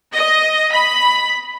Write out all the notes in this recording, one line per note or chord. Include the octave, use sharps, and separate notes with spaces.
D#5
B5